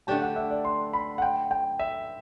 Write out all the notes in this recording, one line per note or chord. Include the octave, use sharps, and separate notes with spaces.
D3 A3 D4 G4 A5
F#5
E5
D5
C6
B5
F#5
G5
G5
E5